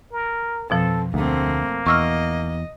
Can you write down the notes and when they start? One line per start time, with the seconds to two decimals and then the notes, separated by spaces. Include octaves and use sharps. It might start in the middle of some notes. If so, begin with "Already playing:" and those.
0.12 A#4
0.70 F2 B2 F3 C4 A4
1.14 D2 A3 A#3 C4
1.86 E2 D#5 C#6 E6 F6